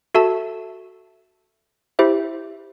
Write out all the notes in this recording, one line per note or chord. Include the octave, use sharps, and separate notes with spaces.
F#4 A4 E5 A5
E4 G4 C5 E5